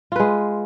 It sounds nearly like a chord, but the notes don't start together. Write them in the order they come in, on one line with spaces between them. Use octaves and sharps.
F4 B4 G#3